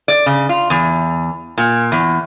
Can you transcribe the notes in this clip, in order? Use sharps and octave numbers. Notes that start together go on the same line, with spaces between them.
D5
C#3
F4
E2
A#2
E2